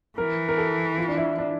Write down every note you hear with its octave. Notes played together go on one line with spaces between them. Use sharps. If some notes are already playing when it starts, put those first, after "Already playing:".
E3 A#4
A#4
A4
F4
D4
E4
D4